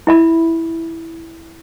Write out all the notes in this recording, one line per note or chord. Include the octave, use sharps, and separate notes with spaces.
E4 E5 B5